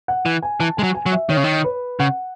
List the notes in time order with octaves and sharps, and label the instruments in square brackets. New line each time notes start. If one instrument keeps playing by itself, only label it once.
[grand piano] F#5
[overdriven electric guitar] E3
[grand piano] G#5
[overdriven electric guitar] E3 [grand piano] A5
[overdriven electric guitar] G#3 [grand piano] G#5
[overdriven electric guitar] F#3
[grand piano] G#5
[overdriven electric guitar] F#3
[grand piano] E5
[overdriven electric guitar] D#3 [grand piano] C#5
[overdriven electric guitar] C#3
D#3
[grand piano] B4
[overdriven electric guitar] C#3 [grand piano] F#5